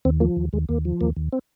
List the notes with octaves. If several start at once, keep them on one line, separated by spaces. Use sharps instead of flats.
D#2 C4
F3 A#3
D#2
D#2 G#3
D#2 A#3
F3
D#2 A#3
D#2
C4